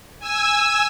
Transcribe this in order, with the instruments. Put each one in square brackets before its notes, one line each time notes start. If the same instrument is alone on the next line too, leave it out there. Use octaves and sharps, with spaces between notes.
[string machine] G#5 E6